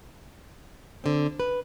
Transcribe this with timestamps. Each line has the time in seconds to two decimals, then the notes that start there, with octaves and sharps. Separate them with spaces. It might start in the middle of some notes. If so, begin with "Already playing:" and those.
1.04 D3 C4
1.40 B4